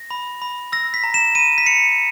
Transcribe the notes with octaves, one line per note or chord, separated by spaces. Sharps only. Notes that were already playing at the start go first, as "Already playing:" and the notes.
Already playing: A#6
B5
B5
E6 A#6
B6
A#5
E7
B5 D#7
B6
B5 C#7